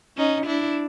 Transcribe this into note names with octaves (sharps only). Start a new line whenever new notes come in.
C#4 D#4
D4 E4